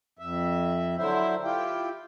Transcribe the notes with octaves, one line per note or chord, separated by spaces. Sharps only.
F2 E5
D3 F#3 E4 C5 E5
E4 F4 G4 G5